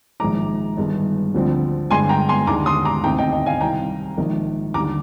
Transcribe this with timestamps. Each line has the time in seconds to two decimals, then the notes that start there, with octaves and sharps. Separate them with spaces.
0.20 A#1 G#2 D#3 G#3 A#5 D6
0.77 G1 G2 D#3 G#3
1.34 D2 D3 F3 C4
1.91 G1 G2 D3 G#3 G#5 C6
2.09 G5 A#5
2.29 G#5 C6
2.47 D#2 D3 G#3 A#5 D6
2.66 C6 D#6
2.85 A#5 D6
3.04 D2 C3 D#3 G5 A#5
3.18 D#5 G5
3.32 D#5 G5
3.46 F5 G#5
3.61 C2 C3 D#3 G5 A#5
4.17 A#1 G#2 D#3 A#3
4.74 D#2 D3 G3 A#5 D6